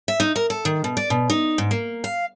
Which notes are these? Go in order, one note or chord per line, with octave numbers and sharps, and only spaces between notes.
E5
D#4
A#4
A4
D#3
B2
D5
B2
D#4
G#2
A#3
F5